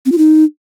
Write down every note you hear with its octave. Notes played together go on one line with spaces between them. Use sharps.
C4
F4
D#4